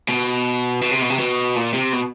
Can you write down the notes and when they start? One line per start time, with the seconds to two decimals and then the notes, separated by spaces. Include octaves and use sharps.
0.09 B2
0.82 B2
0.91 C3
1.01 B2
1.10 C3
1.19 B2
1.56 A#2
1.74 C3
1.92 B2